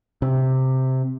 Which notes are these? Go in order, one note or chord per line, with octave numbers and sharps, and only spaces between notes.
C3